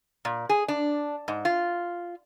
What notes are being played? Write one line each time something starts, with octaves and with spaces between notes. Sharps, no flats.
A#2
G#4
D4
G#2
F4